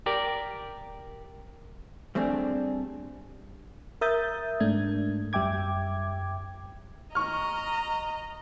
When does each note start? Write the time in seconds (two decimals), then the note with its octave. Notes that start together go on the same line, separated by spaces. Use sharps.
0.06 G4 A#4 D5
2.15 G3 A3 C4 D4 G#4
4.01 A#4 E5 D#6 G6 A6
4.60 G#2 A3 D4 G#6
5.33 F#2 G3 E5 G5 D6 G#6
7.15 D#5 A#5 C#6 F6